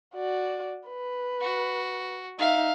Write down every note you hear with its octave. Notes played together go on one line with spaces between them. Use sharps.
F#4 D5
B4
F#4
D#4 E5 F5